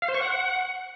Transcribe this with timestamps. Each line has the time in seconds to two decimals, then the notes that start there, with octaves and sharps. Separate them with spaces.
0.02 F5
0.08 C5
0.14 C#6
0.21 F#5